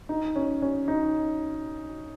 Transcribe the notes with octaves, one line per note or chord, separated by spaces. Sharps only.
D#4
C#4
C#4
D#4